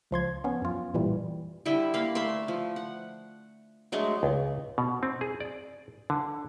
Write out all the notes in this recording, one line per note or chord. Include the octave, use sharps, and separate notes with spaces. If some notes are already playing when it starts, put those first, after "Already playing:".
C#2 F3 C6 G#6
B3 C#4
F#2 F4
A1 A#2 E3 G3
D3 G3 E4 E5
A#3 F5 B5
A3 E5 B5 C6
F3
F#5
F#3 G#3 A3 D4
C#2
B2
C4
G#4
D5
D3